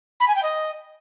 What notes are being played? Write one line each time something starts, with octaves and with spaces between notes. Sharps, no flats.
B5
G#5
G5
D#5